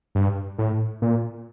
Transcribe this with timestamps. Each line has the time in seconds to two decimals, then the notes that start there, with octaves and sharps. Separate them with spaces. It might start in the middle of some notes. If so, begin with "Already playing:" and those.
0.15 G2
0.58 A2
1.02 A#2